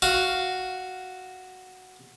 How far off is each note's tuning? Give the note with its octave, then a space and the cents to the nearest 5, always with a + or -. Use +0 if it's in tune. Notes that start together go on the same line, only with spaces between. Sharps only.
F#4 +0 F5 +0